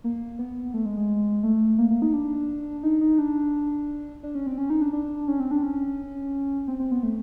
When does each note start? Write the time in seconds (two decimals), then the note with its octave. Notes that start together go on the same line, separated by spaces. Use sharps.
0.04 A#3
0.39 B3
0.74 A3
0.86 G#3
0.97 G#3
1.43 A3
1.78 A#3
1.90 A#3
2.02 D#4
2.13 D4
2.83 D#4
3.01 D#4
3.18 D4
4.23 D4
4.35 C#4
4.47 C4
4.58 C#4
4.70 D#4
4.82 D4
4.93 D4
5.28 C#4
5.40 C4
5.51 D4
5.63 C#4
6.68 C4
6.79 C4
6.91 B3
7.03 A3